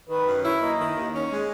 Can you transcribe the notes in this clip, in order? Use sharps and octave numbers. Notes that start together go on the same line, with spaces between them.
D#3 B4
F#2
E4 C#5
A#3 D#5
D#3
D#2
C#4
G#3